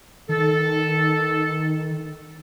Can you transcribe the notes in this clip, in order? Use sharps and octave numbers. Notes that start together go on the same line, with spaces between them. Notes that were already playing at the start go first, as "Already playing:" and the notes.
D#3 A4